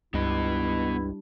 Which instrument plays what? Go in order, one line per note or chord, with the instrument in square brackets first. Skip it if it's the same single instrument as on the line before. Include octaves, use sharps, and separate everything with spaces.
[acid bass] C#2 [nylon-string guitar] G2 [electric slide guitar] B3 D#5 [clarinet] E4